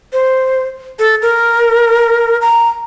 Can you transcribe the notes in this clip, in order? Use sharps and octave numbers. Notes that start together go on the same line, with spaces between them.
C5
A4
A#4
A#5